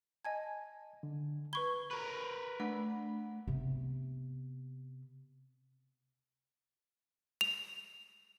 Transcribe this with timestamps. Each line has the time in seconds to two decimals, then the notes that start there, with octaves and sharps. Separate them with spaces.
0.25 D#5 G#5 A5 G#6
1.03 D3
1.53 B4 B5 C#6 G#6 G7
1.91 A#4 B4 C#6
2.60 A3 D4 F#5
3.47 C3 B3
7.41 F7